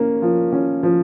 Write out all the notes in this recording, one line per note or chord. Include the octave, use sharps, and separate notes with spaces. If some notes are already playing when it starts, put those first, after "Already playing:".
Already playing: A#3 C#4
F3
C#4
F3